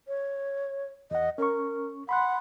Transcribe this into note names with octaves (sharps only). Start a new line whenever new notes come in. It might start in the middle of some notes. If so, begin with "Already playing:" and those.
C#5
E2 D#5 F#5
C#4 A#4 C#6
F#5 B5 C6 F#6